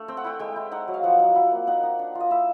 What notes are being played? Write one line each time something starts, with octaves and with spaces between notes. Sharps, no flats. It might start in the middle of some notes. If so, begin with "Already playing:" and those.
Already playing: A3 D4
C4 G5
F#5
E4 G5
G#3 G5
E4
D#4 F#5
F#3
F5
F3 F#5
D#4
E4 F#5
A#3
D#4 F#5
D#4
D4
F4
D#5
E4 E5